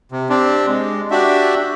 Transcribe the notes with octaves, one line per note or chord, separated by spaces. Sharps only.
C3
C4 D4 G4
G#3
D4 F#4 G4 E5